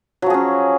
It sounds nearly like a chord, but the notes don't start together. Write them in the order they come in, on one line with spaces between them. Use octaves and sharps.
F#3 F3 G#4 C#4